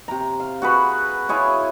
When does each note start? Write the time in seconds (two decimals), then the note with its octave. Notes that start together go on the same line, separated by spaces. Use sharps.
0.08 C3 A#5
0.40 F5
0.62 F#4 G#4 B4 F#5
1.29 E4 F4 G#4 C#5